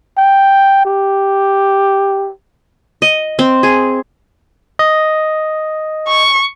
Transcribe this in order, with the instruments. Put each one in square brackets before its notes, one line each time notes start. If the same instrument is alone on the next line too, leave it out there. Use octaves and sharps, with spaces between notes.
[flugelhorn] G5
G4
[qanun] D#5
C4
G#4
[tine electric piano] D#5
[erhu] C#6